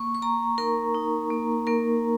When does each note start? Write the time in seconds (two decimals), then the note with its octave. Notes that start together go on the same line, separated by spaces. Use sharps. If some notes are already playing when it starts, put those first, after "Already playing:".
Already playing: A#3 C#6
0.15 C#6
0.22 A#3 A#5
0.58 D#4 A#4
0.95 D#4
1.30 A#3
1.67 A#3 A#4